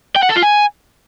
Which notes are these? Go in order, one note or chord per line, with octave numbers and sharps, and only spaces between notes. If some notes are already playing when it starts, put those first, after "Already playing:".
G5
F#5
A4
F4
G#5